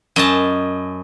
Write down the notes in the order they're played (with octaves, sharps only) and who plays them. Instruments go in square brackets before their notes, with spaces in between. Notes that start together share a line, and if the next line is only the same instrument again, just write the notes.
[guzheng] F#2 D#5 A5